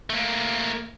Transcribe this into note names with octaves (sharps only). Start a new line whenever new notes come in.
A3 A#3